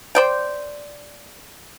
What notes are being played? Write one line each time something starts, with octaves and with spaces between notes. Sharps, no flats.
C5 D5 G5